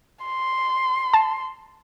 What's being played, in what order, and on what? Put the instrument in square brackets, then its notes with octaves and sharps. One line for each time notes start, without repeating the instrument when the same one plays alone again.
[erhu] C6
[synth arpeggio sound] A5